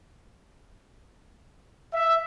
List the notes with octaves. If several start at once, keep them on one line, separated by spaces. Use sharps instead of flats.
E5